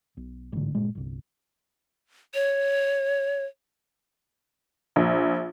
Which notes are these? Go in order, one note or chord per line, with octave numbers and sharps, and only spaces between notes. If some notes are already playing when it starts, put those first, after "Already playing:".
B1
A1 G#2 D3
G1 A#2 G#3
G1 C2
C#5
A#1